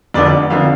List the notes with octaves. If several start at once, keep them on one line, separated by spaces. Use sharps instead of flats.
F1 F2 D3 D5
F1 F2 D3 F5